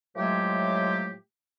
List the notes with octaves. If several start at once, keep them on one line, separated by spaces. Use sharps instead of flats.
A2 F3 F#3 G#3 A3 G4